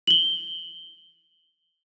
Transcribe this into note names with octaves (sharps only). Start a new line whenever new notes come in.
F#7 G7